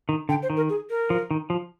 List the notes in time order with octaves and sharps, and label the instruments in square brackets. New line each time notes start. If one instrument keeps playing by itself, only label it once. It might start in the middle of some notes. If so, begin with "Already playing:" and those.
[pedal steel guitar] D#3
[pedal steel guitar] D3 [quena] G5
[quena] C5
[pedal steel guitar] D#3
[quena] A#4
G#4
A#4
[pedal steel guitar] F3
D#3
F3